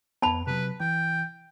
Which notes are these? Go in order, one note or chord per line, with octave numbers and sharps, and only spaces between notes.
F2 B3 A5 B5
C3 F#3 B4
E3 G5